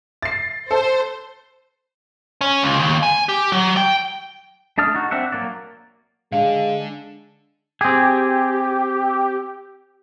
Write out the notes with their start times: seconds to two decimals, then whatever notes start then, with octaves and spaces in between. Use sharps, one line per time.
0.23 A6 C7
0.71 A4 C5
2.41 C#4
2.63 C#2
2.79 D#2
3.03 G#5
3.29 G4
3.52 F#3
3.77 G5
4.78 A3 D4 A5 D#6 F6
4.94 D#4 F#4
5.11 C4 D4 E5 F#5
5.32 F#3 A#3 D5
6.32 D3 G#3 D4 F5
7.81 C4 G4 G#4